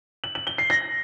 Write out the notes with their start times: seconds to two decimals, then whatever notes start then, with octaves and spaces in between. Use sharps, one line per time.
0.24 F#7
0.35 F#7
0.47 G7
0.58 C7
0.70 A#6